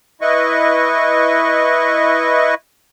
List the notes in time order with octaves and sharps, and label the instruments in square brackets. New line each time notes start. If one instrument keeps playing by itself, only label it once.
[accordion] E4 B4 D#5 C#6